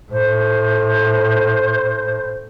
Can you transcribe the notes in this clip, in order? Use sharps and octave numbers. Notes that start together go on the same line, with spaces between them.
A2 C5